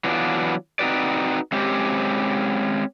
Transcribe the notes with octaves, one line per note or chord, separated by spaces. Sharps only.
E3 F#3 B3 D4 F4
C4 D#4 F#4 B4 D5
G#3 C4 C#4 G4 C5